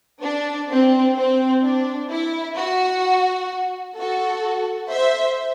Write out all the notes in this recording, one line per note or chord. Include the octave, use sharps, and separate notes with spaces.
D4
C4
C4
D4
E4
F#4
F#4 A4
C5 E5